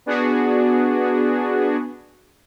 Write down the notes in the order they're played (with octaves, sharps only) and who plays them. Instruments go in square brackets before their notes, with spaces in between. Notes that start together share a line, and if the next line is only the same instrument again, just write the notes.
[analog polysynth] B3 D4 F#4 G#4